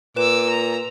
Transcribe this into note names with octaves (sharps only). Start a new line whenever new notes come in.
A#2 B4 D6 E6 E7
A#5